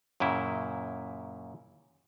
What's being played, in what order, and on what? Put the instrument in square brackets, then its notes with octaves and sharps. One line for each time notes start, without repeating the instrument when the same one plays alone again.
[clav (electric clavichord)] F#2 A#2 C#3 E4